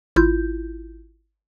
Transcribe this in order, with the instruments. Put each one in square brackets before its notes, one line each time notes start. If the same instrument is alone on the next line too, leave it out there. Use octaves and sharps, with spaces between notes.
[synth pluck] G#1 E4 F4 G6